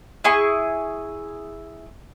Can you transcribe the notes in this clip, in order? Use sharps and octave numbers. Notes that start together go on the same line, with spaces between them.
E4 G#4 C#6